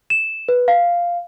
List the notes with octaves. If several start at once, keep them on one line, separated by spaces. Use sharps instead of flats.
E7
B4
F5